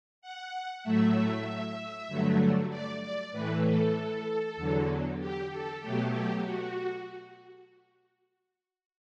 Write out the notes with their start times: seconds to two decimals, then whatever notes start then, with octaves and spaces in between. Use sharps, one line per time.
0.22 F#5
0.83 A2 F#3 A3 E5
2.08 G2 D3 F#3 A3
2.70 D5
3.01 D5
3.32 A2 E3 A3 B4
3.64 A4
4.57 E2 D3 F#3
5.19 G4
5.50 A4
5.81 B2 F#3 A3 G4
6.12 G4
6.43 F#4